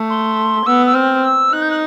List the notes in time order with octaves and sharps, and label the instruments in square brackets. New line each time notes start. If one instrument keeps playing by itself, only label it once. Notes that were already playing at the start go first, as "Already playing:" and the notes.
Already playing: [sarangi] A3
[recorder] C6
[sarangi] B3 [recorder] E6
[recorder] E6
[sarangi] C4 [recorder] F6
[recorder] E6
[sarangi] D#4 [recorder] F#6
[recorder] G6
F#6